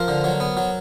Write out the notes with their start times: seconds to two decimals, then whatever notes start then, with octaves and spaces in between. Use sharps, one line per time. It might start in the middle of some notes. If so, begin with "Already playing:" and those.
Already playing: F3 A#4 C5
0.08 D3
0.24 F#3
0.40 B3
0.57 F#3